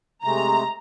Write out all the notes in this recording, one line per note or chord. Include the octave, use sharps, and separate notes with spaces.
C3 G#3 A3 A#5